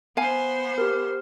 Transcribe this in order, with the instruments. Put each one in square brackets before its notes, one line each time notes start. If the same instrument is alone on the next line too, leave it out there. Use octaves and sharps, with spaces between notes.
[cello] B3 C5 [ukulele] F5 G#5
[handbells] G4 A#4